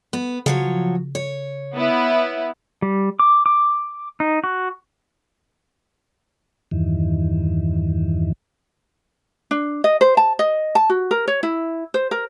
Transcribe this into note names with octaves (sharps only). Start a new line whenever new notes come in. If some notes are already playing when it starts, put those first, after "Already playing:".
B3
C#3 F3 F#3 C#5
C#5
B3 E4
G3
D6
D6
D#4
F#4
E2 G2 D#3 E3
D4
D#5
C5
A5
D#5
A5
F#4
A#4
C#5
E4
C5
A#4